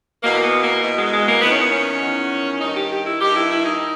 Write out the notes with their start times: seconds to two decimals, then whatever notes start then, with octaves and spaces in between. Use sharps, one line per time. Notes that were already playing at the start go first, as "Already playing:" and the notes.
0.22 E2 B2 A#3
0.43 B3
0.62 A#3
0.81 E2 B2
0.97 G#3
1.12 G#3
1.27 A#3
1.41 E2 D#3 B3
1.50 C#4
1.60 B3
1.71 C#4
2.01 E2 D#3
2.60 G2 D#3 D#4
2.75 G4
2.91 G4
3.05 E4
3.21 G2 D#3 G4
3.35 E4
3.50 E4
3.65 D#4